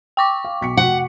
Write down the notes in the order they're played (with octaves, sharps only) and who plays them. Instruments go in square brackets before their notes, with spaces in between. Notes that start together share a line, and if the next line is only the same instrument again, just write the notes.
[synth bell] G5 C#6 D6
[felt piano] F5
B1 B6 C#7
[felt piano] F1 F#4 [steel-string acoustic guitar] F#5